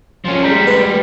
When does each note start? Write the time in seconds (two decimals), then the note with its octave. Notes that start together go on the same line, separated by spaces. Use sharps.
0.25 F3 C#4
0.44 G3 G#3 A#5 G6
0.67 B4